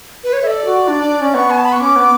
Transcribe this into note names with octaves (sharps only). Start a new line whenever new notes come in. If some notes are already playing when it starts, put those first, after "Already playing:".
B4
C#5
A4 D5 E5
F#4
D4
D4
C#4
B3 C#6
G#5
A5
B5
C#6
C#4 D6
B3